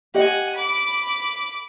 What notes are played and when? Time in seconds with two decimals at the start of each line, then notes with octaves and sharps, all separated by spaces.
0.14 G4 D#5 F#5 G#5
0.55 B5 D6